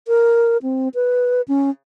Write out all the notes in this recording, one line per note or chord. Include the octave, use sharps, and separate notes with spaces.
A#4
C4
B4
C#4